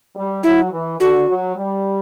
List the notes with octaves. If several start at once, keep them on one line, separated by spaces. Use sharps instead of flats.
G3
F#3 E4
E3
D3 F#4
F#3
G3